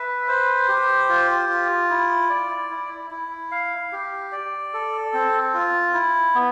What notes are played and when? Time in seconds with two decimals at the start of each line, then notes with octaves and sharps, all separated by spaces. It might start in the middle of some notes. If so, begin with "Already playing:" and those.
Already playing: B4 E5
0.28 C5
0.68 G4
1.09 F4
1.49 F4
1.90 E4
2.30 D5
2.71 E4
3.11 E4
3.51 F5
3.92 G4
4.32 D5
4.73 A4
5.14 C4
5.54 F4
5.94 E4
6.35 B3